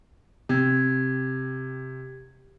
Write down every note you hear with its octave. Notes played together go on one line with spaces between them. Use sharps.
C3 G4 G#6